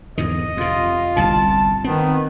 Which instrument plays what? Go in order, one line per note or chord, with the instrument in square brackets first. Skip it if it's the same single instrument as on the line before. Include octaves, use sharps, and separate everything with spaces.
[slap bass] E2 G#2 D3 [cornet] D#5
[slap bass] F2 C3 [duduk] F4
[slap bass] G1 C2 A#2 [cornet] A5
[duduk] D#3 [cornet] B3 [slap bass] C4